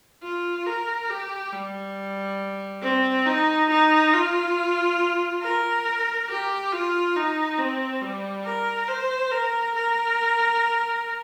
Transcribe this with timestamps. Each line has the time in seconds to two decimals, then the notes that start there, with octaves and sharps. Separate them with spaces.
0.23 F4
0.66 A#4
1.10 G4
1.52 G3
2.82 C4
3.25 D#4
3.70 D#4
4.13 F4
5.42 A#4
6.28 G4
6.72 F4
7.16 D#4
7.58 C4
8.01 G3
8.45 A#4
8.88 C5
9.31 A#4
9.75 A#4